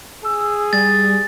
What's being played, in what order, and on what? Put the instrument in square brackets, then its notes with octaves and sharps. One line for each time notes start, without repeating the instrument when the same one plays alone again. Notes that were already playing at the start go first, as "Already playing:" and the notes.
[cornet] G#4 [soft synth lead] E6
[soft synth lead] G3 [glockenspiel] A6